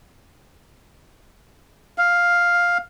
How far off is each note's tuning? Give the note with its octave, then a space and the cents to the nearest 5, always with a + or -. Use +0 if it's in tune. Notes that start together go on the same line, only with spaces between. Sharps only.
F5 +5